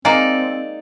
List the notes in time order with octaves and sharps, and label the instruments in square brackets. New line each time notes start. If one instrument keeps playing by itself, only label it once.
[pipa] G#3 A#3 [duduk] C4 [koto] D#4 D5